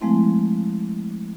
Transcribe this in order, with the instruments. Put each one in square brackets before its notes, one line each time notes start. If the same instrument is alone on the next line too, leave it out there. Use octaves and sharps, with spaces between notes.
[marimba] F3 G#3 A3 C4 E4